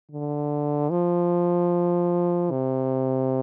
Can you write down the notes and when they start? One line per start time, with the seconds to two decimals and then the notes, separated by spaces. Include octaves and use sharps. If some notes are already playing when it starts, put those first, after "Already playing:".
0.11 D3
0.91 F3
2.50 C3